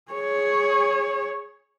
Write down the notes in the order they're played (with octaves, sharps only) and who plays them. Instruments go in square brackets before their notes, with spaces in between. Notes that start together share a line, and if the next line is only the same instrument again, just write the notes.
[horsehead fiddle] G#4 C#5